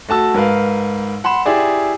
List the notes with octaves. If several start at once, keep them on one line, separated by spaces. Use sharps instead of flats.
A3 F#4 A5 E6
G#2 A#4 B4 F5
F#5 B5 C6 E7
E4 G4 G#4 D5